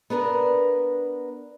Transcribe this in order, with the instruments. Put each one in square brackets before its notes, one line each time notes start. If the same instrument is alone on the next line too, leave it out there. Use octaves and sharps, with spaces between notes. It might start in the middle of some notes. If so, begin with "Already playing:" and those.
[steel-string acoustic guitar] B3 D4 A#4 B4